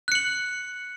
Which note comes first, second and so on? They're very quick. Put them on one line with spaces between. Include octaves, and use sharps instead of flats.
F#6 C#7 F#7